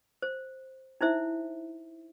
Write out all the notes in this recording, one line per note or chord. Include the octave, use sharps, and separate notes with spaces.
C5
D#4 E4 C5 E5